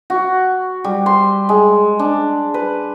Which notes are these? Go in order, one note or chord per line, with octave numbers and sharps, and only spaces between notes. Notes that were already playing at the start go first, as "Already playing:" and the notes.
F#4
G3
C6
G#3
D4
B4